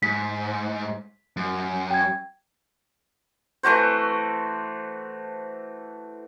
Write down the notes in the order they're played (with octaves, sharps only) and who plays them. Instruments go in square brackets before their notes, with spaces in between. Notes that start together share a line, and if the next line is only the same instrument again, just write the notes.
[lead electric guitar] G#2 [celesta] B6
[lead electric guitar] F#2
[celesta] G5 G#6
[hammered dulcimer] E3 A3 F#4 C5